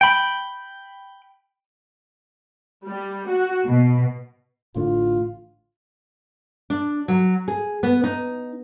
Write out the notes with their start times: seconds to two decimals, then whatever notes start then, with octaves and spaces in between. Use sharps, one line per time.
0.01 G5 B5
2.86 G3
3.27 F#4
3.66 B2
4.75 A1 A2 D3 F4
6.70 D4
7.08 F#3
7.48 G#4
7.83 B3
8.04 D#4